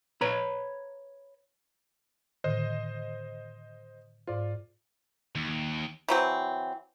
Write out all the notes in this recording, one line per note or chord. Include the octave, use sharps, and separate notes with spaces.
B4 C#5 A#5 B5
A2 D3 D#3 C5 D#5
G#2 F4 C5 D5
D#2
E3 F#3 C4